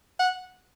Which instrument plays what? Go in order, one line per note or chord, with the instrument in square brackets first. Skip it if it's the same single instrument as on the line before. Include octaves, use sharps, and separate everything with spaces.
[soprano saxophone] F#5